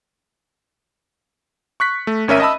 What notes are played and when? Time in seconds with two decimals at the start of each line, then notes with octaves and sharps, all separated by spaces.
1.80 C#6 F#6 B6
2.07 A3
2.28 G#1 C#4 A#4 E5 D#7
2.40 D#5 E5 A5 B5 E6